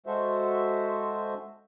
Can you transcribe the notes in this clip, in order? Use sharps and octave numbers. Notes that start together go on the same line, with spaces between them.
G#3 F#4 A4 C5 E5